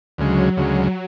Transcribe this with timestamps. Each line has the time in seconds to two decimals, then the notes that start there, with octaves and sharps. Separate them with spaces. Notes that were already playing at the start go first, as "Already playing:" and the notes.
0.18 D2 C#3 F#3 G#3
0.57 D2 C#3 F#3 G#3